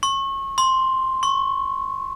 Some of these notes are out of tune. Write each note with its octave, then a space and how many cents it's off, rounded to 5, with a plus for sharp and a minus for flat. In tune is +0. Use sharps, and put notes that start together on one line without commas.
C#6 -30
C6 +5
C#6 -15